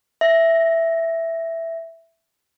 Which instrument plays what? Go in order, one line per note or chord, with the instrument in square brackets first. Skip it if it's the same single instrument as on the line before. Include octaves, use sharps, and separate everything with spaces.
[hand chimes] E5 A#6